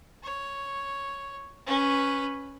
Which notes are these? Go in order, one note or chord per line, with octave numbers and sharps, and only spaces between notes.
C#5
C#4 B4